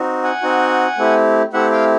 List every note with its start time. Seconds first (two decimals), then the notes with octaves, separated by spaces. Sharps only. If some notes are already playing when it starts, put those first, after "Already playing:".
Already playing: C4 D#4 F#4
0.23 F#5 G#5
0.42 C4 D#4 F#4
0.98 A3 C4 E4 G4
1.53 A3 C4 E4 G4 E5 F#5
1.72 F5 G5